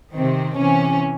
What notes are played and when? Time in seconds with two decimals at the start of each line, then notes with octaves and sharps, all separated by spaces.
0.14 C3 D#3 C4
0.58 C3 E3 C#4